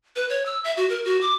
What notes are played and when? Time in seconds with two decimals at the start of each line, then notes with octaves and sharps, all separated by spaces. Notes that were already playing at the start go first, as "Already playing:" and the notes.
0.16 B4
0.30 C#5
0.46 E6
0.64 E5
0.77 F#4
0.90 A#4
1.05 F#4
1.21 D6